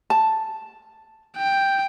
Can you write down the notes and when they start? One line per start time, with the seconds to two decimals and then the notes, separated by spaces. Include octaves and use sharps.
0.10 A5
1.37 G5